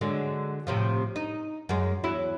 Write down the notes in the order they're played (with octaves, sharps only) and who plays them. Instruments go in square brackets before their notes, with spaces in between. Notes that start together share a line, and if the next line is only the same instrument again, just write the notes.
[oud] D3 F#3 G#3
A2 C3 F3
D#4
F#2 G#3
E2 F#3 E4